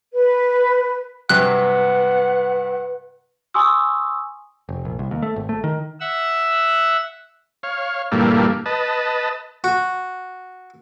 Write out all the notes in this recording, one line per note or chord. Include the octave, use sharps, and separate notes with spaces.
B4
G2 C3 F#3 B4 F#5 F#6
G#5 C6 C#6 D#6 E6
F1
A#1
C2
D#2
A3
G#1
A3
D#3
E5 F#5 E6
C#5 F5
G2 A#2 E3 G3 A3 A#3
B4 D#5 A5
F#4